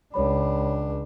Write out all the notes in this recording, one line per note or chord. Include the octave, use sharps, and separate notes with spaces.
C#2 D4 C#5 B5